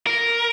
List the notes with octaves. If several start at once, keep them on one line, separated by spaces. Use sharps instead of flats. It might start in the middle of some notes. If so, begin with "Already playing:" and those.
A#4